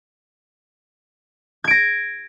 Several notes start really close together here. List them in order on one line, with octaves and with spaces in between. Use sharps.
G#6 D7 A#6